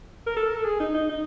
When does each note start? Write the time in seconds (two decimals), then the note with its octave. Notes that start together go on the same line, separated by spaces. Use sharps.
0.26 A#4
0.36 A4
0.46 A#4
0.56 A4
0.65 G#4
0.80 D#4
0.94 D#4
1.09 D#4